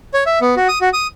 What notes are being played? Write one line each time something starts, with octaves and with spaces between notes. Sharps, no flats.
C#5
E5
B3
F#4
D#6
F#4
D#6